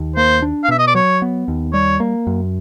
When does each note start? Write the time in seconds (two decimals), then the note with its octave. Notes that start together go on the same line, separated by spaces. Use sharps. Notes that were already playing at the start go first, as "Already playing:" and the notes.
Already playing: D#2
0.16 A#3 C5
0.42 D4
0.64 F5
0.68 B2 E5
0.79 D#5
0.88 D5
0.95 F#3 C#5
1.22 B3
1.48 D#2
1.73 G3 C#5
2.00 A#3
2.27 F#2